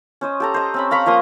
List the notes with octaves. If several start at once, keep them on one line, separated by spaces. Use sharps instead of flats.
C#4 C5 D#5
G4 A4 A#5
C5 D#5
C4 C#4 B5
F5 A#5 B5 C#6
F3 A#3 C6 D#6